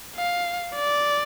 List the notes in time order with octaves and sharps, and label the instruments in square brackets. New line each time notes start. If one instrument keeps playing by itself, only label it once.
[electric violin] F5
D5